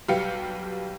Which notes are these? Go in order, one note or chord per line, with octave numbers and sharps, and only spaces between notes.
B1 G3 G4 B4 F5 C#7